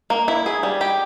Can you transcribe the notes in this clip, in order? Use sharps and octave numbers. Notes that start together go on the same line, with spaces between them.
A#3
E4
G#4
G3
G4